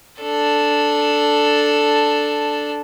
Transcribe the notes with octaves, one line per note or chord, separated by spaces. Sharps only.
D4 A4